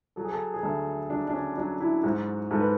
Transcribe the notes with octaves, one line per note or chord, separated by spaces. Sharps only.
F#3 A4
G#4
A4
G#4
D2 A4
F#3 D4
D4
C#4
F#3 D4
E4
G#2 F#4
G#2 A4
B4